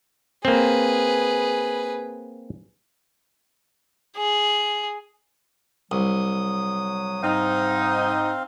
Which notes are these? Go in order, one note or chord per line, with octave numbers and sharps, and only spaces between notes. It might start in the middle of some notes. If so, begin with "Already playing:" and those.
A#3 C4 G#4 B4
G#4
C2 F#3 D#6
G#2 C4 D#4 F5